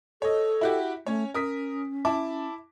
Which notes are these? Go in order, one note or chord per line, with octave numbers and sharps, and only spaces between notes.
A4 C#5 D#5
E4 F#4 G4
A3 C#4 C#5
C#4 A#4 D#6 B6
E4 A5 D6